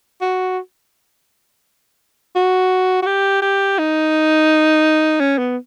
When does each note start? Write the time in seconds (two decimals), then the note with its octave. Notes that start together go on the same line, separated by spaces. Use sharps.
0.21 F#4
2.35 F#4
3.02 F#4
3.06 G4
3.42 G4
3.78 D#4
5.20 C#4
5.38 B3